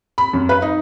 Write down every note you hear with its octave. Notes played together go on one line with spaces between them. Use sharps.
B5
F#2
B4
D#4